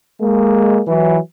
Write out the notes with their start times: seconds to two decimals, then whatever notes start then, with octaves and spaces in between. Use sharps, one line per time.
0.21 G#3 A#3
0.88 E3 F#3